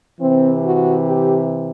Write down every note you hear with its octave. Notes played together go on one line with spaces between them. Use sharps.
C3 E3 C4
F#4
G4